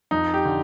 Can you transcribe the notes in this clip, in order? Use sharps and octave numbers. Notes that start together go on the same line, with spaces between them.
F2 D#4
G4
D3